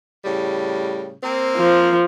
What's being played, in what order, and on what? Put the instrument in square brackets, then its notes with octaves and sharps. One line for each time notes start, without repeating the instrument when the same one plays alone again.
[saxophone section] A2 C#3 G3
A#3 C4
[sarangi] F3